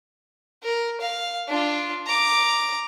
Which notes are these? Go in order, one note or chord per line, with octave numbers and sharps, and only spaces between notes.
A#4
F5
D4 F4
A#5 D6